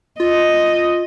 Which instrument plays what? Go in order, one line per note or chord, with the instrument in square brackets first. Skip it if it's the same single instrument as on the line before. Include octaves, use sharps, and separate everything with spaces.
[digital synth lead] F4 [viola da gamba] D#5